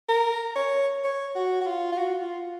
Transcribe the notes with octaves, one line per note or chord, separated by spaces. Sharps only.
A#4
C#5
C#5
F#4
F#4
F4
F4
F#4
F4